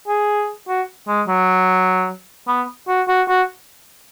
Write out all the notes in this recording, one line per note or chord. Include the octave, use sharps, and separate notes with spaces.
G#4
F#4
G#3
F#3
B3
F#4
F#4
F#4